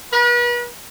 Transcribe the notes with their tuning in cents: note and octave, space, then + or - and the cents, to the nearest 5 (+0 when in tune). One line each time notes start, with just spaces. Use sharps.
B4 -40